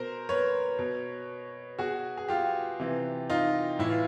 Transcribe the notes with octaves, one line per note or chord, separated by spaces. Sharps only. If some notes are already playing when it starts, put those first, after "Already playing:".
Already playing: B2 A#4 C5
B4 C#5
B2
B2 F#4 G#4
G#4
F4 G4
C3 E3
D#4 F4
A2 E3 E4
F4